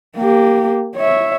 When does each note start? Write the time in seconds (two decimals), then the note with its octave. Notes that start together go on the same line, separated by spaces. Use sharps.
0.17 A#3 G4
0.96 C#5 E5